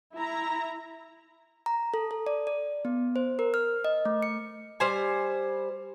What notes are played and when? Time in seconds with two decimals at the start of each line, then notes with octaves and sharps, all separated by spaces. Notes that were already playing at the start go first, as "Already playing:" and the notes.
0.16 E4 A#5
1.66 A#5
1.94 A4
2.11 A4
2.27 D5
2.47 D5
2.85 B3
3.16 C5
3.39 A#4
3.54 F6
3.85 D#5
4.05 A3
4.23 C#7
4.80 G3 C5 G#5